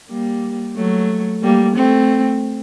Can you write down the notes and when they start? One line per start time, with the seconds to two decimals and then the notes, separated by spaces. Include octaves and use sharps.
0.10 G3 A#3
0.76 F#3 A3
1.43 G3 A#3
1.76 A3 C4